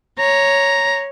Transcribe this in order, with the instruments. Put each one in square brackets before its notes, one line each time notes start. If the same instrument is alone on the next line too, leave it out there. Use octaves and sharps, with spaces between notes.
[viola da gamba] C#5 [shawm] A#5